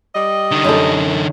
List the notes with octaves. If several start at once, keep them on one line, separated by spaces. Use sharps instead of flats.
G3 D#5
D3 D#4
F#2 A4